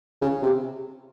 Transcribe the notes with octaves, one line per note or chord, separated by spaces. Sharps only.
C#3
C3